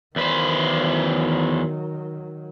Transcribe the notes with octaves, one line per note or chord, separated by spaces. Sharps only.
E2 D#3 F#3 B4 C5